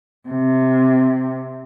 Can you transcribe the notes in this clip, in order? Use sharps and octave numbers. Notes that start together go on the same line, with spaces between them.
C3